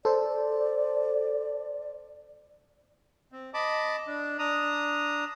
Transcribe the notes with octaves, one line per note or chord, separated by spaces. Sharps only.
A4 C5 D5
C4
D#5 A5 B5 D6
D4
D4 A#5 D#6